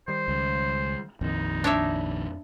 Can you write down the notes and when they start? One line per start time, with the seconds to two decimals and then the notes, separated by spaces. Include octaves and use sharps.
0.08 D#3 G3 C5
0.28 C#2
1.21 A#1 F2 D#3 C4 D#4
1.64 D4 C#5 E5